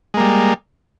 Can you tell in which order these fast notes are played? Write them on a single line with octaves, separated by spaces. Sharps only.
G#3 A#3 G3